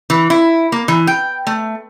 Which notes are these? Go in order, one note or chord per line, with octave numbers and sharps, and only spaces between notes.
E3
E4
A#3
E3
G5
A3